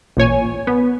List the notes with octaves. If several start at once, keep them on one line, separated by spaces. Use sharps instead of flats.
A1 A#2 C#5 G#5
B3